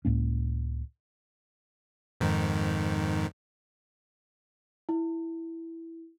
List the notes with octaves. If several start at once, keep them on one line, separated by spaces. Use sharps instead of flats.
C#2 A2 A#3 C#4
F2 G#2 D#3
E4